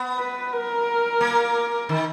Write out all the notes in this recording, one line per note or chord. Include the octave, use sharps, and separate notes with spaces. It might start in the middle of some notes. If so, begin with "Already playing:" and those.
Already playing: B3
B4
A#4
A#3
D#3